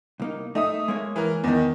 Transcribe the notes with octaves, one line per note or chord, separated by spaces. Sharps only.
C2 A#3 D#4
A3 D#4 E5 D#6
G#3 A#3 C#5
E3 A#4
E2 D#3 B3